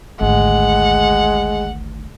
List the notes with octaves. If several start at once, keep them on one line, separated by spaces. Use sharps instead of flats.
G#1 D2 G#3 F#5